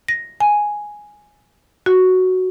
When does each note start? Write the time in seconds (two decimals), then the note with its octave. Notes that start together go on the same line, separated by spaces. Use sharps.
0.09 A#6
0.40 G#5
1.86 F#4